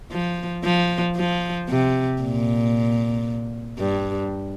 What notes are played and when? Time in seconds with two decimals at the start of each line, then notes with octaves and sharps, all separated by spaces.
0.12 F3
0.64 F3
1.16 F3
1.69 C3
2.22 A#2
3.79 G2